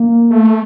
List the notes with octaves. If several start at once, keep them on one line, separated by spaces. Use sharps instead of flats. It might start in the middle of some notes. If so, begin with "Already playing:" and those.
Already playing: A#3
A3